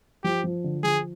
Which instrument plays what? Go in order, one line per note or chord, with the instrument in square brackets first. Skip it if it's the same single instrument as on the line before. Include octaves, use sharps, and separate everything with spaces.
[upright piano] F3 [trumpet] G4
[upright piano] F3
D3
[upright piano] F3 [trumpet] G#4